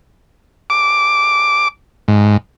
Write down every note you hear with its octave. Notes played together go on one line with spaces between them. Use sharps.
D6
G#2